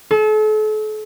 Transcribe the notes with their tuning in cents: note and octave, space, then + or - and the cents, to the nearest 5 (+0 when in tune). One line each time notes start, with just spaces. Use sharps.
A4 -40